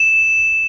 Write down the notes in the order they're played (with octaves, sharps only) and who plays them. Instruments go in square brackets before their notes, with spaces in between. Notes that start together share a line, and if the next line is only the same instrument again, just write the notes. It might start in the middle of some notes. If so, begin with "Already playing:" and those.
Already playing: [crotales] E7